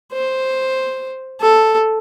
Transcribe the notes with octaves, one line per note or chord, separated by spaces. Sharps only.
C5
A4